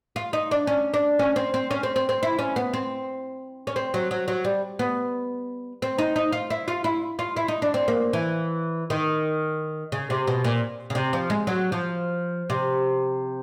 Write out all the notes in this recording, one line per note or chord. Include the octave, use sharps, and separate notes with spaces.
F4
D#4
D4
C#4
D4
C#4
C4
C4
C#4
C4
C4
C4
E4
C#4
B3
C4
C#4
C4
F#3
F#3
F#3
G3
B3
C4
D#4
D#4
F4
E4
F4
E4
F4
E4
D#4
D4
C4
A#3
E3
D#3
C#3
C3
B2
A#2
C#3
C3
F3
G#3
F#3
F3
C3